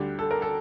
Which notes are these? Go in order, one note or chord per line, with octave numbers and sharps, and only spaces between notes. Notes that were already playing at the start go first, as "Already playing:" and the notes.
Already playing: D2 D3 G3 G4
A4
A#4
A4